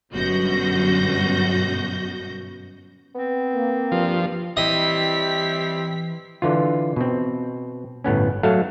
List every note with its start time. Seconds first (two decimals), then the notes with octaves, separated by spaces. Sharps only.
0.13 G1 F#2 B2 F#4 G6 A#6
3.15 B3 C4
3.53 A#3
3.92 G2 F3
4.57 E3 G3 C4 E4 D#5 B6
6.42 D3 E3 F4
6.96 B2 C4
8.04 G1 A2 B3 C#4
8.43 F#3 A3 F#4 A4 F5